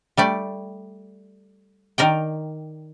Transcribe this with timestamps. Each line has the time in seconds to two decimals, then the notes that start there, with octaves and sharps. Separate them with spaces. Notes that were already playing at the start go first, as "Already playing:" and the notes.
0.17 G3 A3 D5
1.98 D#3 A#4 D5 G5